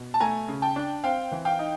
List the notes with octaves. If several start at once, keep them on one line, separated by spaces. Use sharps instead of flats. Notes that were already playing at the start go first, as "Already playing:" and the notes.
Already playing: B2
A5
A3 G#5 A#5
C#3
G5 A5
D4
C4 F5 G5
E3
F5 G5
D#4